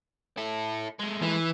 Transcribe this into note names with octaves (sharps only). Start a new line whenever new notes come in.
E4 A4
G#3 A3
E3